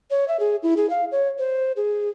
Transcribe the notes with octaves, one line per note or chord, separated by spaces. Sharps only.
C#5
E5
G#4
E4
G#4
F5
C#5
C5
G#4